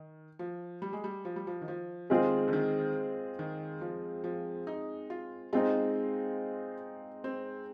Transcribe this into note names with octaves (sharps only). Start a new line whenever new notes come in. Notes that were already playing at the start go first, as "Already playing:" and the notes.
Already playing: D#3
F3
G3
G#3
G3
F3
G3
F3
D#3
F3
D#3 G#3 C4 F4 G#4
D3
D#3
D#3
F3
F3
D#4
F4
G#3 C4 D#4 F4
C4